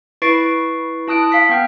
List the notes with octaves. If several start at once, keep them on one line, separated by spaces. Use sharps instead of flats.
E4 B4 C#6 A6 C7 D7
E4 A5 D#6 F#6 D7
F5 B6
B3 G5 F6